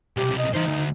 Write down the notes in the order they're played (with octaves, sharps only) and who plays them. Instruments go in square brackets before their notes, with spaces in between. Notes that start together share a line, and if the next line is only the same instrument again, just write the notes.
[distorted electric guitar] B1 C3 [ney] G4
[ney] D#5
[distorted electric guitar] E3 C5 [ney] D#4
[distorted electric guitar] D2